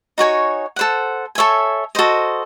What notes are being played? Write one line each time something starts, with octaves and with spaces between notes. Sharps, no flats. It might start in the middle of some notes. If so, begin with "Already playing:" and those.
D#4 F#4 C#5 G#5
A4 C5 F#5
A4 C#5 E5 G#5
F#4 A4 C5 D#5